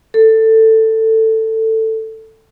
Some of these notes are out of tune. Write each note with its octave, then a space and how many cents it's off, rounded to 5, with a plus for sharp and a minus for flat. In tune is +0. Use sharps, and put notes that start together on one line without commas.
A4 +15